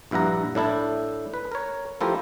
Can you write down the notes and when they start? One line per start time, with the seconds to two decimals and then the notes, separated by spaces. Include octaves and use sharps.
0.11 A#1 G2 E4 F#5 A#5
0.55 A2 D4 E4 A4
1.34 B4
1.52 A#4 C#5
2.01 F3 A3 E4 F4 G4 A#4